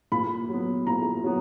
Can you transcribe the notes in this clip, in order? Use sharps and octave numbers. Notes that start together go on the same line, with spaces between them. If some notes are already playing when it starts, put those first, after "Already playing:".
A#2 B5
F#3 B3
A#2 A#5
F#3 B3